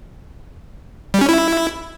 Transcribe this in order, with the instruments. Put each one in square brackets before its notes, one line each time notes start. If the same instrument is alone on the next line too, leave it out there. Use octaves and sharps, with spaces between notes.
[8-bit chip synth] G3
C#4
E4